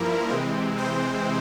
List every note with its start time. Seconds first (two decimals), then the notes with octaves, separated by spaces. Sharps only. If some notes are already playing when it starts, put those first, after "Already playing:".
Already playing: G2 F3 A#3 E4 A#4
0.29 C3 E3 G#3 C4
0.78 C4 C5